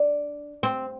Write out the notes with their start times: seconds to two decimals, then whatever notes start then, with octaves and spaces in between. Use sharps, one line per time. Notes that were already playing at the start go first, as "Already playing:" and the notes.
Already playing: D4
0.63 C4